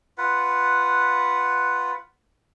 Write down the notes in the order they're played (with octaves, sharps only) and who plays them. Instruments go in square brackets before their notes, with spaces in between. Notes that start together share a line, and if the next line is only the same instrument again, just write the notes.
[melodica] F4 B4 F#5